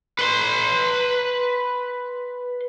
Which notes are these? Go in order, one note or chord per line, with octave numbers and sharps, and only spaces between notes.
B4 C6